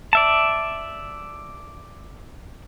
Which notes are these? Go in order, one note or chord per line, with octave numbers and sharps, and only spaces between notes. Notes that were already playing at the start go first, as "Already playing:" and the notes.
D5 E5 A5